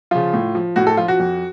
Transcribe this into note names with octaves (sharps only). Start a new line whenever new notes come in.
C#3 F3 F4
A2
F3
A2 F#4
A4
F3 F4
F#4
F2